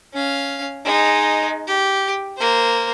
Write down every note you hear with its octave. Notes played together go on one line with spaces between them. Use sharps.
C#4 F5
G#3 D#4
G4
A#3 C5